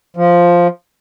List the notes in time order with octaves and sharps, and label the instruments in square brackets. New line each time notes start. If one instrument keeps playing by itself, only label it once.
[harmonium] F3